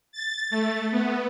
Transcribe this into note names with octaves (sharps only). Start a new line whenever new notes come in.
A6
A3
B3